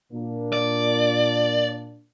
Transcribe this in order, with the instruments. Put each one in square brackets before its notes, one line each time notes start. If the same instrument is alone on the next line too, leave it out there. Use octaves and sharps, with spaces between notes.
[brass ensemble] A#2 A#3 D4
[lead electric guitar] D5